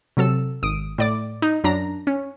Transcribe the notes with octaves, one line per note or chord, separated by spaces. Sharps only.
C3 F#3 A4 E6
G#1 D#6 D7
A2 D5 D6
D#4
F#2 D4 A#5 A#6
C#4